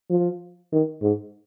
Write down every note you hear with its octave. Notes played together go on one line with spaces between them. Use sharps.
F3
D#3
G#2